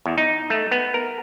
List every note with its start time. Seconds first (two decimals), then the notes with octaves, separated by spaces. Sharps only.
0.06 E2
0.18 D#4
0.50 A3
0.71 B3
0.94 A#4